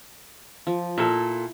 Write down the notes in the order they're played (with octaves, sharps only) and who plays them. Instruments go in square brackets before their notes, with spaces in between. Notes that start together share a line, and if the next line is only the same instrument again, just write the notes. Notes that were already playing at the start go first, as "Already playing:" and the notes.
[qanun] F3
[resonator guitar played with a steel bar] A#2 A4 [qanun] E4